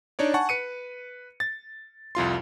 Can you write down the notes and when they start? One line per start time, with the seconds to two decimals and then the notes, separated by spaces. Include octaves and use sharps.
0.19 D4 D#4 C#5 D5
0.34 F#5 G#5 A5 C#6
0.49 B4 C#7 D#7
1.40 A6
2.15 C2 F2 F4 C6